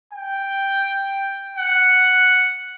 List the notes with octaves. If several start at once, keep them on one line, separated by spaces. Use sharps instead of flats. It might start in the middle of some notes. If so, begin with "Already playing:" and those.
G5
F#5